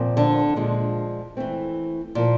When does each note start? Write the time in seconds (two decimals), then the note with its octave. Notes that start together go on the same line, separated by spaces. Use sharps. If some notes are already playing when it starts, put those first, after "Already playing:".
Already playing: A#2 F3 C4
0.17 D3 D4
0.56 A#2 F3 G#3
1.37 E3 A3 C4
2.15 A#2 F3 A#3